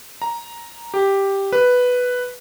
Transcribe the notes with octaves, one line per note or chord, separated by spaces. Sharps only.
A#5
G4
B4